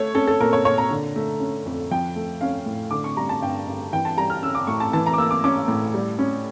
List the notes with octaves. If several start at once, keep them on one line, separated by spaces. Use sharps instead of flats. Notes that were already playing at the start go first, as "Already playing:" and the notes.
Already playing: A3 C#5
C#4 A4
A4
A#2 A#4
C#5
A#2 C#5
A#5
D3
A3
C#4
F2
F3 G5
A3
C#4 F5
A2
D3 D6
C#6
G3 A#5
A5
G2 G5
G2
E3 G5
A5
G3 A#5
F6
C#4 E6
D6
A2 C#6
A5
E3 A5
A#5
D6
A#3 E6
D6
C#4 D6
A2
G3
C#4